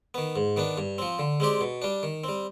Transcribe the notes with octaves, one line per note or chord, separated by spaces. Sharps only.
D#3 B3
G#2
D#3 B3 D4
G2
F3 C4
D3
G#3 C4 G4 D5
B2
G3 D4
D#3
G3 C4